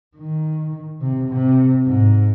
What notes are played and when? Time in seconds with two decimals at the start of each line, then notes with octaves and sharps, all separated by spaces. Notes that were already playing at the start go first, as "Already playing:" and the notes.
0.17 D#3
1.01 C3
1.29 C3
1.86 G#2